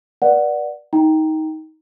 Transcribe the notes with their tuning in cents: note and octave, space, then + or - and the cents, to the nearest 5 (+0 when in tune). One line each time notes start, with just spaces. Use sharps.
B4 -40 D5 +0 F#5 +0
D#4 +20 G5 +0 A#5 +0